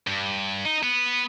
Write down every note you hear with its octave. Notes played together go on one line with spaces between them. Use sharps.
G2
D#4
B3